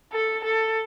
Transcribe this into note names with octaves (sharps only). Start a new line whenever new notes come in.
A4
A4